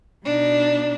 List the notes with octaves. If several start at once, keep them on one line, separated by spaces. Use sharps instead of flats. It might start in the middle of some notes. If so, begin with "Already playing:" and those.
B2 D4 D#4